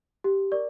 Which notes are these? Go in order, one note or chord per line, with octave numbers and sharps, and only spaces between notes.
G4
A#4 D5 C#6